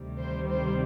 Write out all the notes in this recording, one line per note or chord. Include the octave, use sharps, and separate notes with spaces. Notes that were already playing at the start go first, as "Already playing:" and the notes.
Already playing: D2 C3 D#3 G3
C5
C5